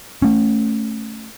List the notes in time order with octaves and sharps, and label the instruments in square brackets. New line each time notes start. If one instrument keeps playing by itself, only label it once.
[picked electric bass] A3 C#4